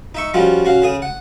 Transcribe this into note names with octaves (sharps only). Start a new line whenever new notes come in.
D#4 E5 C#6
F3 G3 C#4 F4 F#4
C#4 F#4 F5
C#3 G#4 D#6
F#5